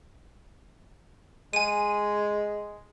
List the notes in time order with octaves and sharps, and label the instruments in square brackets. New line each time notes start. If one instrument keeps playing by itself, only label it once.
[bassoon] G#3 [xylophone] G#5 D#7